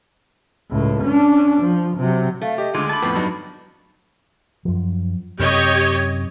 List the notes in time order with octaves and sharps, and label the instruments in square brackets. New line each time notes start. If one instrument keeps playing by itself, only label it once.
[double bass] C#2 A2
C#4 D4
F3
C3 F#3
[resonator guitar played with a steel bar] A3 [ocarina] F5
[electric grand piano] G4 [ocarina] D#5
[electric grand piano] D2 [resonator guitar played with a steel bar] D3 G#3 [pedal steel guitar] F4 [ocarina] D6
[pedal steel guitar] A5 B5
[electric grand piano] F2 A2 [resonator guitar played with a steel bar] B3
[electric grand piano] G2 F#3 D#4
[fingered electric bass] F#2 F3
[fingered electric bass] F#2 C3 [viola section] G4 C#5 D#5